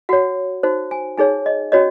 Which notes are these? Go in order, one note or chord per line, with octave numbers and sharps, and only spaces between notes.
F#4 C#5 F#5
D#4 F#4 C5
G#5
D#4 G#4 C#5 G#5
D#5
C#4 F#4 C#5 D#5